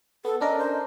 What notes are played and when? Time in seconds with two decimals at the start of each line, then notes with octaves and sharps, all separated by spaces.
0.25 B3 A4
0.41 C#4 D4 A#4 D#5
0.59 C5